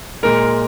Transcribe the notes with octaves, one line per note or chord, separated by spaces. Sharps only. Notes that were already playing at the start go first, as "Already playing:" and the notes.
A#2 G#3 A#4